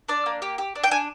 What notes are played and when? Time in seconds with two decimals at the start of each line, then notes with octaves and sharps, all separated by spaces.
0.09 D4 D5
0.26 A#3
0.42 G4
0.58 G4
0.76 D4
0.84 G5
0.91 D4 G#5